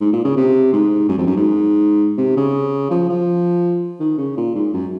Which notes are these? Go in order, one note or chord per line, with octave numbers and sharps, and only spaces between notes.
G#2
A#2
C#3
C3
G#2
F#2
F2
F#2
G#2
C3
C#3
F3
F3
D#3
C#3
A#2
G#2
F#2